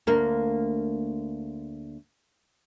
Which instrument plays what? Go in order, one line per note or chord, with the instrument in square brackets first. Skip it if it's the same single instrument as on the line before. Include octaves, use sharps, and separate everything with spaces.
[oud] D2 A#3